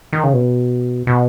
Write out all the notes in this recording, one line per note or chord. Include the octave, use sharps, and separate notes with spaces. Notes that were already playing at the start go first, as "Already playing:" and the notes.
D#3
C#3
B2
B2